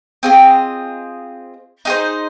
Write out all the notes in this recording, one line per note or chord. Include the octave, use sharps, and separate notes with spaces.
C4 F4 G#4 D#5
D#4 G#4 C5